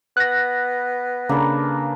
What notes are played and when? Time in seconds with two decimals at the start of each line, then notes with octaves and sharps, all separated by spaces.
0.17 B3 F#6 A#6
1.29 C#3 A#3 D4 A4 B4